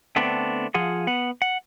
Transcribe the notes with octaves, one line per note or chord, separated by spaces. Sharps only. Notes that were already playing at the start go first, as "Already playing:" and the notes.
D3 A3 B3 C4 D4
F3 F4 G#4 F#5
B3 F#5
F#5